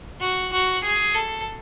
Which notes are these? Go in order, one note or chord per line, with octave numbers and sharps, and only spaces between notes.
F#4
F#4
G#4
A4